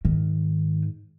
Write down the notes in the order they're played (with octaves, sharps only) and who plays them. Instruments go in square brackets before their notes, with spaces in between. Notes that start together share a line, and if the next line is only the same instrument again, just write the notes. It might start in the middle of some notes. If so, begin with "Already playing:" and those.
[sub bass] G#2 [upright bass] D#3